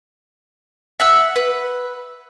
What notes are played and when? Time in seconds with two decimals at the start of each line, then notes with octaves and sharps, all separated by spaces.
1.00 E5 F#5 E6
1.36 B4